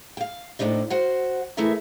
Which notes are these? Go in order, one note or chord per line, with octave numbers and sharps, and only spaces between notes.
F5 G5
A2 C3 G3 D4 D#4
F#4 C5 F#5
E3 A3 E4 G#4 A#4 E5